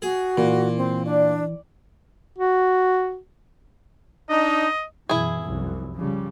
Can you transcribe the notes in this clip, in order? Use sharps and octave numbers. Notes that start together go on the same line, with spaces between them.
F#4 G#4
A#2 E3
C4
D4 D5
F#4
D4 D#4 D#5
F#2 B2 E3 E4 G#4
F1 C2 F#2
C#3 F3 G3